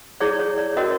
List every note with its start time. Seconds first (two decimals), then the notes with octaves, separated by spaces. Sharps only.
0.21 E4 G#4 C#5 D5
0.39 C#5
0.58 D5
0.76 C#4 F#4 A#4 C#5 D#5